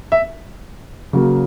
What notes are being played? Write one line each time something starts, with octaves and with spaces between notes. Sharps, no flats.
E5
C#3 F#3 A#3